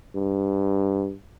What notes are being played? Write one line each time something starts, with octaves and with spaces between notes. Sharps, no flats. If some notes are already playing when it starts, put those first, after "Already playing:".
G2